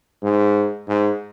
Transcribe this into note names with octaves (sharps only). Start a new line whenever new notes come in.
G#2
G#2